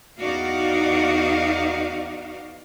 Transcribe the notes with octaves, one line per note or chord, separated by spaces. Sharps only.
E2 D#4 F#4 D5 F5